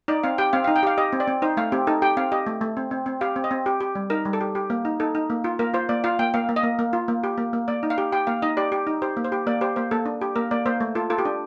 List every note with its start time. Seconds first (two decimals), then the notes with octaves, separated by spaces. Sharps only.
0.08 D#4 D5
0.23 C4 F5
0.38 G4 G5
0.53 C4 F5
0.64 D#4 F5
0.76 G5
0.83 G4 F5
0.98 G4 D#5
1.13 C4
1.20 D5
1.28 C4
1.42 D#4 C5
1.57 A3 F5
1.72 C4 G4
1.87 D#4 A4
2.02 G4 G5
2.17 C4 F5
2.32 G4 D#5
2.47 A3
2.61 A3
2.77 C4
2.91 C4
3.06 C4
3.21 G4 F5
3.36 C4
3.44 D#5
3.51 C4
3.66 G4
3.80 G4
3.95 G3
4.10 D#4 A#4
4.25 G3
4.33 A4
4.41 G4
4.55 G4
4.70 A#3
4.85 D#4
5.00 D#4 A4
5.15 D#4
5.30 A#3
5.44 F4
5.59 A#3 A#4
5.74 F4 C5
5.89 A#3 D5
6.04 F4 F5
6.19 A#3 G5
6.34 A#3 F5
6.49 A#3
6.56 D#5
6.63 A#3
6.79 A#3
6.93 F4
7.08 A#3
7.24 G4
7.38 A#3
7.53 A#3
7.68 A#3 D5
7.83 D#4
7.90 F5
7.98 G4
8.12 G4 G5
8.27 A#3 F5
8.42 D#4 D#5
8.57 G4 D5
8.72 G4
8.87 D#4
9.02 G4 C5
9.17 A#3
9.24 C5
9.32 G4
9.47 A#3 D5
9.61 G4 C5
9.76 A#3 C5
9.91 A#3 A4
10.06 D4
10.21 G4
10.36 A#3 A#4
10.51 A#3 D5
10.66 A#3 C5
10.81 A3
10.95 F4 A4
11.10 F4 A4
11.18 G4
11.25 D4